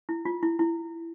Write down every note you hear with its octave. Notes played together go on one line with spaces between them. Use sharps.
E4
F4
E4
E4